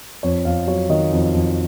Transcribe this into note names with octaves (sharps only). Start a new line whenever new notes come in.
F2 C#5
F2 F5
F#3 C#5
D#3 D#5
F2
F2